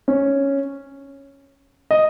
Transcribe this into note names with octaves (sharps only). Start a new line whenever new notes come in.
C#4
D#5